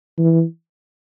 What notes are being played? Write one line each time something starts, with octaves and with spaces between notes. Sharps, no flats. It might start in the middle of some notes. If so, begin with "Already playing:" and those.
E3